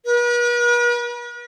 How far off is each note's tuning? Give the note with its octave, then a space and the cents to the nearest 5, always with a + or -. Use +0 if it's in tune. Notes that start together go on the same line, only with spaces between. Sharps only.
B4 -45